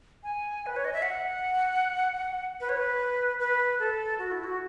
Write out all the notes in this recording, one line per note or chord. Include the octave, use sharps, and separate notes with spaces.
G#5
B4
C#5
D#5
E5
F#5
B4
C#5
B4
B4
A4
F#4
E4
F#4